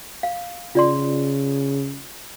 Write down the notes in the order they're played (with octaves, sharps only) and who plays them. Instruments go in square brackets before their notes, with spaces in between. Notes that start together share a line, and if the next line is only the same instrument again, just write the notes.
[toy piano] F5
[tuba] C#3 [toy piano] F4 D5 C6